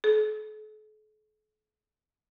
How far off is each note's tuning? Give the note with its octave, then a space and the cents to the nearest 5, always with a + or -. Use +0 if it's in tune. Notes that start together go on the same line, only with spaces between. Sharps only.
A4 -45